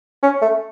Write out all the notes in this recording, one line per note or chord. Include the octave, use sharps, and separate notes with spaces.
C#4
A3